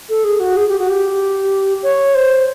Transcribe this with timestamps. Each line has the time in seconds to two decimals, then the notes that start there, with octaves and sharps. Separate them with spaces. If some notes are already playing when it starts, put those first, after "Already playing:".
0.09 A4
0.24 G#4
0.40 F#4
0.57 G#4
0.68 G4
0.79 F#4
0.89 G4
1.83 C#5
2.15 C5